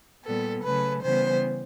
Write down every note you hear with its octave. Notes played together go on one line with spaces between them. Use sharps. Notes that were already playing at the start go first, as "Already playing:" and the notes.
A#2 G3 B3 A4
C#3 F#3 A3 B4
C#3 E3 G3 B3 C5